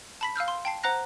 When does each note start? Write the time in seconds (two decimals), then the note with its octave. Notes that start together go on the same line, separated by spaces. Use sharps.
0.21 A5 B5 B6
0.36 F5 E6 F6 G6
0.48 C6
0.65 G5 A5 C7
0.83 C5 F#5 A#5 F#6 A#6